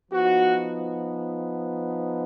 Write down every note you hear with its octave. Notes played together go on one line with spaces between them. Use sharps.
F3 B3 D#4 F#4